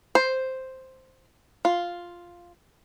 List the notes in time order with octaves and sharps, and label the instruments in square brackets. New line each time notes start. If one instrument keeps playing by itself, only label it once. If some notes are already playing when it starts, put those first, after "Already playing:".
[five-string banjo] C5
F4